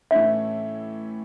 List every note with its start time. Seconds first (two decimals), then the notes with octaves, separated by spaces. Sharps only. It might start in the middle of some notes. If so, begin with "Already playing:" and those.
0.11 A2 E3 A3 C#4 E4 E5